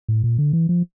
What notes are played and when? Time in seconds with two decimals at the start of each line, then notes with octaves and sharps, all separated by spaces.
0.09 A2
0.24 A#2
0.38 D3
0.53 E3
0.69 F3